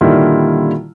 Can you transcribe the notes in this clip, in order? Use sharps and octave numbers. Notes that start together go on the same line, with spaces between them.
A#2 D3 D#3 G3 E4 F4